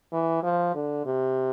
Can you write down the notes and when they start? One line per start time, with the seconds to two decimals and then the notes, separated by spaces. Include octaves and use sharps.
0.12 E3
0.43 F3
0.74 D3
1.05 C3